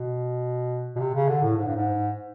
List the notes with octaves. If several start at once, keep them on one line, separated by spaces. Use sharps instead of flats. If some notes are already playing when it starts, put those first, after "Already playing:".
Already playing: B2
B2
C3
C#3
D3
A2
G#2
G2
G#2